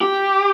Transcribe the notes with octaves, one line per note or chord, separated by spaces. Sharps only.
G4